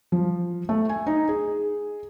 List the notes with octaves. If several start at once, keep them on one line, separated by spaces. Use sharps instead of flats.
F3
A3
G#5
D#4
G#4